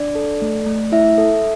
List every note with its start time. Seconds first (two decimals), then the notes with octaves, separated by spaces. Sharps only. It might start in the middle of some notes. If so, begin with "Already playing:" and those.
Already playing: D4 D5
0.15 A4
0.42 A3
0.66 A3
0.92 E4 E5
1.18 A4